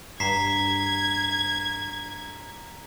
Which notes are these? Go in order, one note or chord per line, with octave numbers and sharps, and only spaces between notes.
G2 A#5 G#6 B6 C7